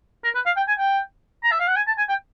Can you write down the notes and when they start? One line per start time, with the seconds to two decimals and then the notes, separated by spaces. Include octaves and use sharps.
0.24 A#4
0.35 B4
0.46 F5
0.57 G5
0.68 G#5
0.79 G5
1.43 A#5
1.52 E5
1.60 F5
1.68 F#5
1.76 G#5
1.87 A5
1.98 G#5
2.09 G5